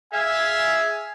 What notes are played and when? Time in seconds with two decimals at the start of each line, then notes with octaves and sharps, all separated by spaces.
0.13 G#4 E5 F5 G#5